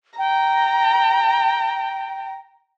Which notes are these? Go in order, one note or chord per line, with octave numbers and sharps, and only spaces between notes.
G5 A#5